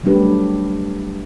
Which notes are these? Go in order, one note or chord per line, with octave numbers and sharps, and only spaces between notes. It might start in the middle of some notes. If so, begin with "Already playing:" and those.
F#3 G3 A3 D4 G4 B4